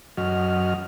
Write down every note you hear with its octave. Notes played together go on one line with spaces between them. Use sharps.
F#2 F#3 F#4 D#5 F6